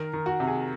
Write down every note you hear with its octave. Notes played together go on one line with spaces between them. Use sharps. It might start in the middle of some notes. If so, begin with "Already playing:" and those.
Already playing: D#3 A#4
D#3
F#4
C3
G#4